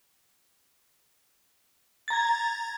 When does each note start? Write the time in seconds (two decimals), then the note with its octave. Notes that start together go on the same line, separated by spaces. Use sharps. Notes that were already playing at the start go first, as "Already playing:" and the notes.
2.08 A6
2.10 A#5
2.13 G#6